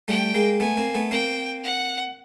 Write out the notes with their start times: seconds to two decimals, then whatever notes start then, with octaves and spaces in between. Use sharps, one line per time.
0.08 G3 A3 G5
0.34 G#3 A#3
0.60 A3 B3 G#5
0.77 A#3 C4
0.94 A3 B3
1.11 A#3 C4 G5
1.63 F#5